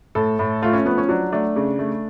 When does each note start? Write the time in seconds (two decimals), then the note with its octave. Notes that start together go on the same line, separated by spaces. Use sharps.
0.15 A2 A4
0.39 A2
0.62 A3 F4
0.73 C#4
0.85 F3 B3
0.98 C#4
1.09 F#3 D4
1.32 A3 D4
1.56 C#3
1.79 A3